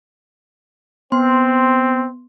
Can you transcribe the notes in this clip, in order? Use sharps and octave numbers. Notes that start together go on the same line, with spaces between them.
B3 C4 C6